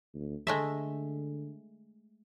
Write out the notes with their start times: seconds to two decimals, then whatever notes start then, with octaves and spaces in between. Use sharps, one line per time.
0.14 D2
0.47 D3 G#3 A3 E5